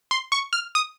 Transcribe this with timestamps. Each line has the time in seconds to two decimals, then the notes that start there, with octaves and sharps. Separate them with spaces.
0.11 C6
0.32 C#6
0.53 F6
0.75 D#6